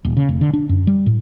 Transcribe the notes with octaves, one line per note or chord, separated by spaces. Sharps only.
D#1
C#3
F1
D3
D4
F#2
G3
A2